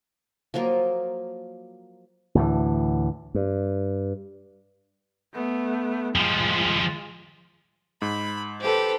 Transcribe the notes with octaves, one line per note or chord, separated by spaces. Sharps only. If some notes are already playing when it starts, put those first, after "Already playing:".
F3 F#3 A#3 F4
D2 A2 E3
G2
A3 B3
F3 G3 G#3 F4
G#2 B5
G4 A4 B4 C5